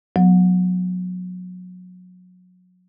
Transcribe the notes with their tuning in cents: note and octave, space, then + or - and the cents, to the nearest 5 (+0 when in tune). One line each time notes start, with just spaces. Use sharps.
F#3 -30 B3 -5